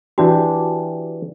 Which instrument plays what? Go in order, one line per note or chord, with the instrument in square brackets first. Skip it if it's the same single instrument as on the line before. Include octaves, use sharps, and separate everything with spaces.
[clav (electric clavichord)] E3 D4 G4 [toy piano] F#4